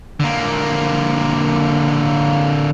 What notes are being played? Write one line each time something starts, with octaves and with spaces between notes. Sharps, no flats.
D3 A#3